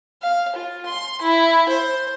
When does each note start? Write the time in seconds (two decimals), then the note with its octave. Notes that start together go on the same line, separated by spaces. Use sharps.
0.22 F5
0.55 F4
0.86 C6
1.22 E4
1.69 C5